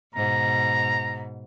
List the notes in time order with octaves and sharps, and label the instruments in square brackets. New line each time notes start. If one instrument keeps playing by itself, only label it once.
[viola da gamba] G#2 B2 [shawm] A#5